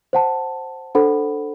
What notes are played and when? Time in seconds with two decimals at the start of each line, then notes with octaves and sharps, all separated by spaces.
0.13 C5 F#5 A5
0.95 D4 A4 C5 F#5 B5